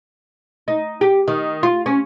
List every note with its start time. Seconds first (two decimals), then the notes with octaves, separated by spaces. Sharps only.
0.68 D#4
1.01 G4
1.28 D#3
1.63 F4
1.86 C#4